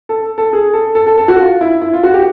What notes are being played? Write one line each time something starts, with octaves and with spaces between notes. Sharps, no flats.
A4
A4
G#4
A4
A4
A4
A4
F#4
F4
E4
E4
F4
F#4
G4